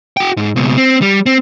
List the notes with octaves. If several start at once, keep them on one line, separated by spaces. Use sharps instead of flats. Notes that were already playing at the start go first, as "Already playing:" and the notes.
F#4 G5
G#2
C#2 B2
C4
G3
C4